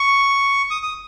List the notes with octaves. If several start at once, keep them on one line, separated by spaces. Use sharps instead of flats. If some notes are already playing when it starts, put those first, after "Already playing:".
Already playing: C#6
D#6
D#6